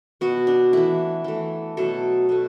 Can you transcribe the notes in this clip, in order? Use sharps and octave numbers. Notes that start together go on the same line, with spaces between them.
B2 B3 F#4
D4
E3 A3 E4
E3 A3
B2 F#3 A3 A4
B2 A3